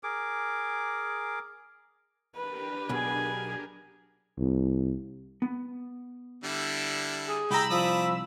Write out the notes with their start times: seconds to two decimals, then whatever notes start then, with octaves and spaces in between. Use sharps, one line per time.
0.03 G#4 A#4 D6
2.36 D4 G4 A#4 B4
2.89 B1 B2 G#4 G#5
4.38 C2
5.42 B3
6.44 D3 G3 E4
7.29 G#4
7.51 C2 G4 D#5 G5 A#5 B5 E6
7.70 F3 D5 D#6